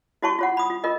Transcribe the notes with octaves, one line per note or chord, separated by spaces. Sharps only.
E4 F#4 C#5 A5 C6 C#6
F4 C#5 F#5
B5 D#6
F4
F4 A#4 D#5